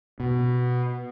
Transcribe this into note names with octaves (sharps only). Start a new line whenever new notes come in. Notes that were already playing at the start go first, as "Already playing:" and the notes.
B2